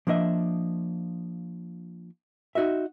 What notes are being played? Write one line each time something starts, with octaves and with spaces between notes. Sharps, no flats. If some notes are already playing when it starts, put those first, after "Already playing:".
F3 A#3 D4 D#5 E5
D#4 F#4 D#5 E5